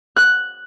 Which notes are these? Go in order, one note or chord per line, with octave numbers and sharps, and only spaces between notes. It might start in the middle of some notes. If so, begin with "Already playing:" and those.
F#6